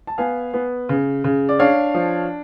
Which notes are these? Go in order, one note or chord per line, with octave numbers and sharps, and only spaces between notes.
A5
B3 F5 G#5
B3
C#3
C#3
D5
D4 C#5 F5
F3